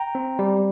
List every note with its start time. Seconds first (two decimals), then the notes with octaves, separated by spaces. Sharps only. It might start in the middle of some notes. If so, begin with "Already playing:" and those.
Already playing: G5 A#5
0.15 C4
0.39 G3